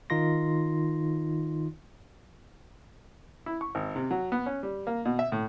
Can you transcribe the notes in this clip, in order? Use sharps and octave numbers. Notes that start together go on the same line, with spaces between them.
D#3 D#4 F4 C6 A#6
E4
C#6
G#1
C3
F#3
B3
C#4
G3
A#3
B2
E5
A2